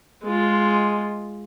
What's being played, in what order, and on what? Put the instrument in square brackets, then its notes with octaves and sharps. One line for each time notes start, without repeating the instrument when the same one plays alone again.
[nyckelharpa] G#3 F4